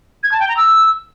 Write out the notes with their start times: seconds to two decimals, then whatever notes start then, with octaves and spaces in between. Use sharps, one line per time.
0.23 G#6
0.32 A5
0.40 G5
0.48 A#5
0.57 E6